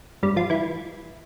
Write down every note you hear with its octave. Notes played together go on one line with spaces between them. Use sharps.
G2 G3
F3 F4
E3 E4